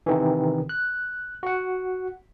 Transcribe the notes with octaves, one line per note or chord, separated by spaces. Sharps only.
C3 D#3 E3
F#6
F#4 F#5